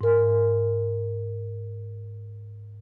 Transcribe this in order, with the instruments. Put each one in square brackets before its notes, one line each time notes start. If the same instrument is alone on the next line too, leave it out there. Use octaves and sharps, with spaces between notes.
[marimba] G#2 A#4